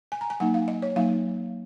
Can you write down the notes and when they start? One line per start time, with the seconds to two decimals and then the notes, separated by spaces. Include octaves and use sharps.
0.12 G#5
0.21 A#5
0.30 G#5
0.40 F#3 A#3 D#4 F#5
0.54 F5
0.68 D#5
0.82 C#5
0.96 F#3 A#3 D#4 F5